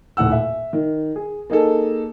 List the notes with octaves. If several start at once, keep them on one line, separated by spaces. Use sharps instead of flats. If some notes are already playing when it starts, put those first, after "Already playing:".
D#1 A2 F#5 E6
E5
D#3
G#4
A#3 D#4 G#4 A4